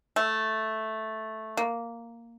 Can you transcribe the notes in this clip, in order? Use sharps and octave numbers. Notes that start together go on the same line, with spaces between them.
A3
A#3